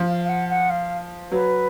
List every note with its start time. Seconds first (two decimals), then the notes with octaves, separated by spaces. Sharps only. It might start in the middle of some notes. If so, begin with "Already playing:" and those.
Already playing: F3
0.08 F5
0.25 F5
0.29 F#5
0.49 F#5
0.70 F5
1.31 F#3 B4